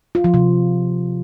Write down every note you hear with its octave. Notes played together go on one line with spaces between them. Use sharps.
F4
F3
C3